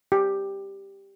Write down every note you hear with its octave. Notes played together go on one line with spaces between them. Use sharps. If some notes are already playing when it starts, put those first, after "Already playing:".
G4